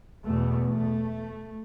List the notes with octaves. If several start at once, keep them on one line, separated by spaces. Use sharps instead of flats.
E2 B2 A3
A3